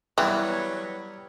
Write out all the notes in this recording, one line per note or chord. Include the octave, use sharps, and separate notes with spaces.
E3 F#3 G3 B3 B4 C#5